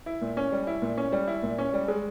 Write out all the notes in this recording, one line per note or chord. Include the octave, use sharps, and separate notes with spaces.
E4
A#2
C#4
G3
E4
A#2
C#4
G3
E4
A#2
C#4
G3
G#3